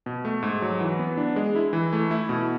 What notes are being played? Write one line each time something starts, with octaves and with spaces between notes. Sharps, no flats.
B2
A3
G#2
F#3
E3
B3
D4
G#3
E4
E3
A3
E4
B2